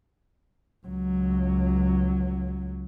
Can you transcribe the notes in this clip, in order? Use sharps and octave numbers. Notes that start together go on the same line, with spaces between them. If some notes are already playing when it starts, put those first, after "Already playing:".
C#2 F#3